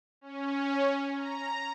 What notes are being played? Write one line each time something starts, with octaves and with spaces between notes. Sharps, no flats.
C#4
A#5